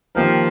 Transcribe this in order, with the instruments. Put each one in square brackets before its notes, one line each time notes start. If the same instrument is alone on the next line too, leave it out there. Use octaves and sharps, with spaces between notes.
[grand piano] D#3 A#3 G4 A#4 [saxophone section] F3